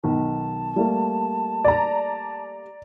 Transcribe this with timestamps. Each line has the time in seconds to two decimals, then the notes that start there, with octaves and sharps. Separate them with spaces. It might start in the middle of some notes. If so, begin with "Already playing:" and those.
0.04 B1 D#3 A5
0.76 G3 A3 A#3
1.65 D5 A#5